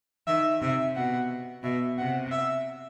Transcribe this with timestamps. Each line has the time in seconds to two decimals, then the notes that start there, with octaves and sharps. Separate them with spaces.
0.27 D#3 E5
0.61 C3 E5
0.95 B2 F#5
1.63 B2 E5
1.98 C3 F#5
2.31 E5